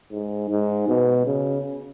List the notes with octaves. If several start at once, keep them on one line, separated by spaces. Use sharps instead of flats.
G#2
G#2
B2
C#3